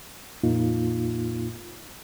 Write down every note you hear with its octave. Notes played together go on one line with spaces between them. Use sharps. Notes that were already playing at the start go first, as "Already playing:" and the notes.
F2 A#2 A#3 D#4 F4